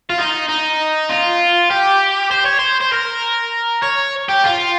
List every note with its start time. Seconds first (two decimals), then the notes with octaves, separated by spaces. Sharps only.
0.10 F4
0.18 D#4
0.49 D#4
1.10 F4
1.71 G4
2.31 C5
2.45 C#5
2.59 C5
2.80 C5
2.92 A#4
3.83 C#5
4.29 G4
4.44 F4